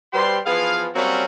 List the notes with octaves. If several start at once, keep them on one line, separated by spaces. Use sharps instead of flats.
B2 G3 G4 C5 C6
E3 F3 B3 G#4 F5
F#3 G3 A#3 C4 C#4 F#4